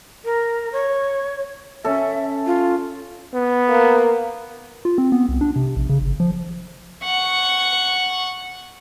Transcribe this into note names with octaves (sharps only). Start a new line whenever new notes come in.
A#4
C#5
C#4 A4 E5
F4
B3
A#3
F4
C4
B3
C2
D4
C3
A#1
C#3
G1
F3
F#5 C#6